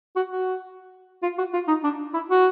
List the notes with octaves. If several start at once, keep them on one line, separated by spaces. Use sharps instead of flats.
F#4
F#4
F4
F#4
F4
D#4
D4
E4
F#4